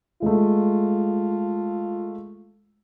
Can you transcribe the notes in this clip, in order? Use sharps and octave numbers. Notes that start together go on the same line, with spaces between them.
G#3 A3 F4